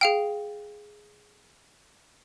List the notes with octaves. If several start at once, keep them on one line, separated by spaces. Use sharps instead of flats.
G#4 F5 G5